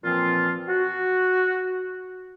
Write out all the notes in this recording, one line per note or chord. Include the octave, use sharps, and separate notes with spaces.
A#2 E3 F3 C4 F4
F#4